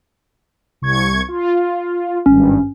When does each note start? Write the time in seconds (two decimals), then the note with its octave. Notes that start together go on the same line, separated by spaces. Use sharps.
0.82 C2 C#6 G#6
1.28 F4
2.26 G#1 G2 C#4